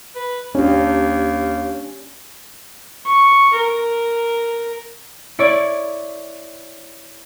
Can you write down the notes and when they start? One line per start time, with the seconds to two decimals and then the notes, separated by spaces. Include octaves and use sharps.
0.15 B4
0.55 D#2 C#4 D4 G4
3.05 C#6
3.52 A#4
5.39 E4 C#5 D5